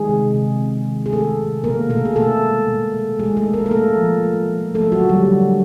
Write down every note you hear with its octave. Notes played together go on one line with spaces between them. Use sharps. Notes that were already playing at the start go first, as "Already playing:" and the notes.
Already playing: D#3 G#3 G#4
C3
C3
C3
D#3
G#4
D#3 A3 A4
C3
B2 A#3 A#4
B2 A3 A4
G#4
B2 A3 A4
G#3
B2
G#3
B2 G#3 G#4
A3 A4
G#3
A#3 A#4
A#4
A3 A4
F3
A3
F3
F3 A3 A4
F#3 F#4
D3
G3 G4
D3